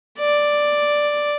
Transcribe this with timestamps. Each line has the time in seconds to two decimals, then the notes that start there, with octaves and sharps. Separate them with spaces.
0.19 D5